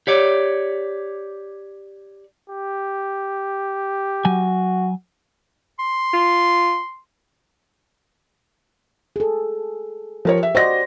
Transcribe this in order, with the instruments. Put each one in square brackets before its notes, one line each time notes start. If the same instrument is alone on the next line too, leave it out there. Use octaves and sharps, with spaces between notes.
[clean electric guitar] G4 C#5 D5
[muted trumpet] G4
[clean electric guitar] F#3 G#5 [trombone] F#4
[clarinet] C6
[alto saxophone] F4
[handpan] G#4 A4
[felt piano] F3 A#4 C#5 [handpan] G4
[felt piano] E5
[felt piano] F#4 D#5 A#6 [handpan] C5 D5